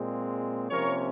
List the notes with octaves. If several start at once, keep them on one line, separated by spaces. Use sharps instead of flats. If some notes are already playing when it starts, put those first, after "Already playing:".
Already playing: A#2 G#3 C4
C3 F3 A#3 C#4 A#4 C#5